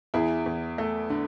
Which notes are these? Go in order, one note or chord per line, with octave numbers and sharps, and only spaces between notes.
E2 E4 G#4
E2
A3
D3